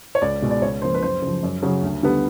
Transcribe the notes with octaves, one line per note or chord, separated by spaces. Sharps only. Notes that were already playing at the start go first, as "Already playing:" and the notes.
C#5
C#2 D5
B2 G#3
D5
C#2 C#5
C#3 F3 A#3 C5
B4
F#2 C5
C#3 F3
F#2
C#3 F#3
D2
D3 G3 B3